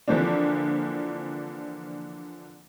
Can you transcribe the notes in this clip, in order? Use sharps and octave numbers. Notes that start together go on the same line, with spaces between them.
D3 E3 F3 A#3 C4 D4